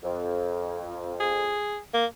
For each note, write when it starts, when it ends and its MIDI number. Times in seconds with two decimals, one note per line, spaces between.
0.03 1.58 41
1.20 1.78 68
1.94 2.06 58